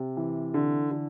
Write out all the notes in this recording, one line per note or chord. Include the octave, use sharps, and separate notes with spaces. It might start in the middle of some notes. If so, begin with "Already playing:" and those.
Already playing: C3
E3
D3
D3